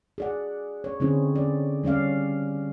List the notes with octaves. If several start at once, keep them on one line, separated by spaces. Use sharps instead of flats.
G#4 D5 F#5
C#5
D3 C4 C#4 E4 G#4 C5
C#4 D5
G3 C#4 D5 F5